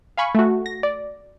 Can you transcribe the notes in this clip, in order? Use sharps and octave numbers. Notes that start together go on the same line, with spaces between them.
F5 G#5 B5 C#6
A3 F#4
A#6
D5